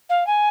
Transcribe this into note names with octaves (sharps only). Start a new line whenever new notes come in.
F5
G#5